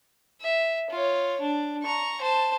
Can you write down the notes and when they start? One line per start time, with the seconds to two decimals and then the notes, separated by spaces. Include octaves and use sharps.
0.42 E5
0.90 F4 C#5
1.41 D4
1.83 A#5 C#6
2.21 C5 A5